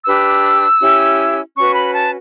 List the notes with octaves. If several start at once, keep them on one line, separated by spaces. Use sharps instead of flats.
D4 G4 B4 E6
C#4 E4 G4
C#4 F#4 B4 C#6
B5
A5